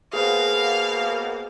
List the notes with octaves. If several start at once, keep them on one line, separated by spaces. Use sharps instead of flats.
B2 A#3 G#4 B4 C5 F5